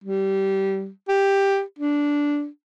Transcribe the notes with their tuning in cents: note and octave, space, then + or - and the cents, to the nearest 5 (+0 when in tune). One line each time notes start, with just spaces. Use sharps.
G3 -20
G4 +5
D4 -10